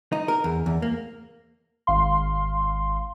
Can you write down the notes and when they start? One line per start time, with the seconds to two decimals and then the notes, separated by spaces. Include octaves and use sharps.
0.12 D#4
0.28 A#4
0.44 E2
0.66 E2
0.82 A#3
1.87 G#1 F5 C6